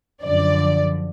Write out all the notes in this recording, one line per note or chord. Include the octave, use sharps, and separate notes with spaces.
F#2 D3 F3 D5